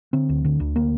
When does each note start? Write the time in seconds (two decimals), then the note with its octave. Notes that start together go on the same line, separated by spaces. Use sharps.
0.13 D3 C4
0.29 D2
0.45 D3
0.60 D2
0.76 A#3